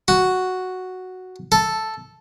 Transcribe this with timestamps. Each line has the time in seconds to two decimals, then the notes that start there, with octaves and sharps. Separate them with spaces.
0.08 F#4
1.52 A4